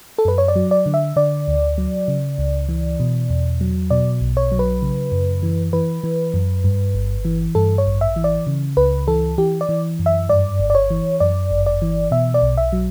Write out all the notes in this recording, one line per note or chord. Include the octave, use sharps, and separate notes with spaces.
A4
F#2 B4
C#5
D5
F#3
D5
D3
E5
D3 D5
D2
F#3
C#3
C#2
E3
B2
E2
F#3
B2 D5
B1
C#5
F#3
B4
C#3
F#2
E3
E3 B4
E3
F#2
G2
G1
E3
G2 A4
C#5
A1
E5
E3
D5
C#3
C#2 B4
E3 A4
E3 G4
D5
E3
F#2
E5
G2 D5
G1
D5
C#5
E3
F#2 D5
G1
D5
E3
B2 E5
D5
B1
E5
F#3